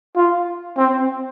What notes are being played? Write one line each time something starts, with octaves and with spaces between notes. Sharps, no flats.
F4
C4